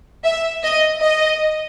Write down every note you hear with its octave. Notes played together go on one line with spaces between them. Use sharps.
E5
D#5
D#5